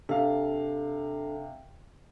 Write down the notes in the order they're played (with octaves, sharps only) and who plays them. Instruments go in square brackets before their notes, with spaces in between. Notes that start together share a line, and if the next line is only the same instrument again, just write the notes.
[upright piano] C3 F5 [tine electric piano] D4 A4